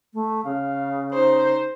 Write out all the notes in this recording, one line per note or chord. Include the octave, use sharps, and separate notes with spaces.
A3
C#3 F5
D#4 C5